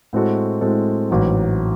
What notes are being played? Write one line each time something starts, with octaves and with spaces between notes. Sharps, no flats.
A2 G#3 C4 F#4 A4
A2 G#3 C4 F#4 A4
A1 G#2 F#3